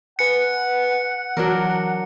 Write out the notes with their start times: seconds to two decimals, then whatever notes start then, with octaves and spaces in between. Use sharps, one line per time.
0.19 B4 F#5 G#5 F#6 C#7
1.37 E3 F#3 D4 A#4